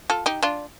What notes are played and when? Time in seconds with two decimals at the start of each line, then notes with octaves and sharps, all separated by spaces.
0.10 F4 A4
0.26 D#4 G4
0.43 D4 F4